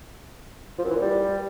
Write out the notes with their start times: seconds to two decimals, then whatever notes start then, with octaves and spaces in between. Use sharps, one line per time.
0.79 F3
0.84 F#2
0.90 E3
0.96 A#2
1.02 G3